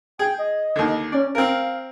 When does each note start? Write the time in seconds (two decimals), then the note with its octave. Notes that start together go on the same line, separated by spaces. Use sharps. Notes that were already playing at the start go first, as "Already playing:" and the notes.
0.19 G#4 G5
0.38 D#5
0.76 D#2 D3
1.12 C#4 D5
1.35 C4 A#4 F5